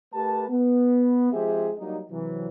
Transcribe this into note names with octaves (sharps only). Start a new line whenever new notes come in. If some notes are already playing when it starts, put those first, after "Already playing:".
A3 G4 A#4 B4 A5
B3
F3 G#3 C4 G4 G#4 E5
F#3 G3 A#3 D#4
C3 E3 F#3